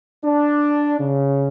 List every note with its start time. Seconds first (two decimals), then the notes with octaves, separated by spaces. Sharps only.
0.25 D4
0.99 C#3